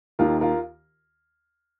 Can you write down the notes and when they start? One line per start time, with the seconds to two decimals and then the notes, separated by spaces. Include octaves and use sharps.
0.19 D#2 D#3 F4 A#4
0.41 F4 A#4